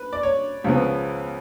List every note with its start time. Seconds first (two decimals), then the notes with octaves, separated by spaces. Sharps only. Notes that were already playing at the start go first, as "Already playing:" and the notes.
Already playing: B4
0.13 D5
0.23 C#5
0.64 C#2 C#3 F3 B3